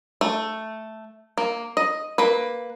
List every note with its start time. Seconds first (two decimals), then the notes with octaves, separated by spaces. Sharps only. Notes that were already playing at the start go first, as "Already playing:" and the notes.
0.21 A3
1.38 A#3
1.77 D#5
2.18 A#3 B4